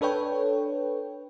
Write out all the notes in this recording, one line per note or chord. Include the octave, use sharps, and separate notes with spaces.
D4 A4 B4 C#5 G5